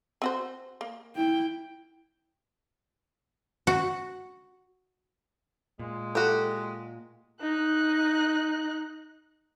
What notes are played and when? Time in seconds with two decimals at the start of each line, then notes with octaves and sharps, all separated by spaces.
0.22 C4 F#4 C5
0.81 A#3
1.15 E4 G5
3.67 F#4
5.80 A#2 G#3
6.15 F#4 G4 A4
7.41 D#4 F#6